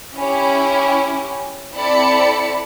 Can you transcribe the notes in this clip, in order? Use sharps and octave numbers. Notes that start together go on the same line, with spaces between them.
C#4 E4 G4
C4 E4 A4 D5 B5 C#7